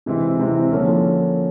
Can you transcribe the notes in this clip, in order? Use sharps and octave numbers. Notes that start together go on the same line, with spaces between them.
C3 E3 G#3 C4 E4
C3 E3 G#3 C4 E4
D3 F3 A#3 C#4